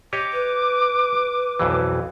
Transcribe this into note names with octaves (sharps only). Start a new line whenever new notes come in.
G4 C#5 D#5 D6
B4
B1 F2 E3